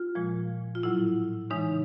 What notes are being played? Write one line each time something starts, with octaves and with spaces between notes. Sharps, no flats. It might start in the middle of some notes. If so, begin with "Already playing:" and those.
Already playing: F4
A#2 F3 G#3
F4
A2 F#3 E4
C#3 E3 G#3 D#4